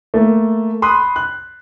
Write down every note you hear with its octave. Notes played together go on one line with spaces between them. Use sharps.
A3 A#3
B5 C6 D#6 F#6
F#6